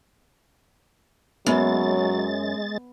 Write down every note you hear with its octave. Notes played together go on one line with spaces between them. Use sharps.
F#2 F#3 G#3 B3 A6